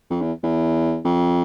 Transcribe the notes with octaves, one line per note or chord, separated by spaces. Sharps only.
F2
E2
E2
F2